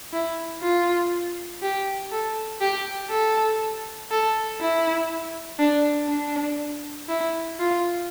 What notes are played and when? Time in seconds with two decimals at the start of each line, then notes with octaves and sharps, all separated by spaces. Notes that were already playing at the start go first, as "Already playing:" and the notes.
0.13 E4
0.62 F4
1.63 G4
2.12 A4
2.61 G4
3.11 A4
4.11 A4
4.61 E4
5.59 D4
6.09 D4
7.08 E4
7.59 F4